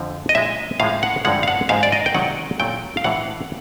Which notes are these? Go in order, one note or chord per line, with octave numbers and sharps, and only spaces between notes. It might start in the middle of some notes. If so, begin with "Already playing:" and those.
Already playing: F2 D3 F3
D#5
A#2 F3 G#3 E5
A2 F3 G#3 F5
F#5
G2 D3 F3 G#3 F#5
F5
F#5
G#2 F3 G#3 F5
D5
D#5
G5
C3 D#3 F#3 F#5
A#2 F#3 A3 G5
F5
A2 E3 G#3 F#5